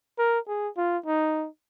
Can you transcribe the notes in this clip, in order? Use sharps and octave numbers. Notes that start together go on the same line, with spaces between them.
A#4
G#4
F4
D#4